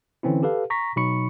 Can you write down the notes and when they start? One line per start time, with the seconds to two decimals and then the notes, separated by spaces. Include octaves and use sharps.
0.23 D3 E3 C4 C#4 E4
0.43 G4 A4 B4 F5
0.70 A#5 C#6 A#6 B6
0.96 B2 F#3 D#4 B5 C#6 C#7